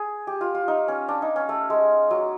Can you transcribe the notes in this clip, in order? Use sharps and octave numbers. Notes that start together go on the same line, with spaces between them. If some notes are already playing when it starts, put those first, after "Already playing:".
Already playing: G#4
G4
F4
F4
D#4
C#4
D4
D#4
C#4
A3
G#3
F#3